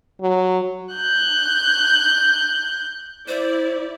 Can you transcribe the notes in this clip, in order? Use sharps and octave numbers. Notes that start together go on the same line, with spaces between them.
F#3
F#6 G6
E4 C5 D5